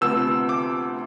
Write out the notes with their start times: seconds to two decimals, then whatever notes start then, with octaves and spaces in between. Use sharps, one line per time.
0.01 D2 C3 F3 B3 E6
0.49 D6